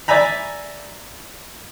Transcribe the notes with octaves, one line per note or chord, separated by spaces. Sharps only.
D5 E5 G#5 A#5 B5